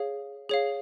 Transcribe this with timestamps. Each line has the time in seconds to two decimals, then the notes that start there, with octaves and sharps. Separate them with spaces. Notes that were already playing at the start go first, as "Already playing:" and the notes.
Already playing: G#4 C#5 F5
0.49 G#4 C#5 F5